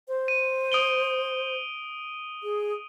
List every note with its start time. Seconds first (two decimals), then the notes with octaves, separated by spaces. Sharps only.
0.08 C5
0.28 D#7
0.72 D#6 D7 G7
2.43 G#4